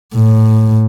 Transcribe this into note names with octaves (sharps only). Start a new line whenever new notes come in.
A2